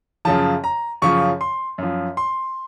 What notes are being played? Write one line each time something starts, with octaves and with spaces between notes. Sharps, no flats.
F#2 C#3 F3 A5
A#5
F#2 C#3 F3 C#6
C6
F#2 F3
C6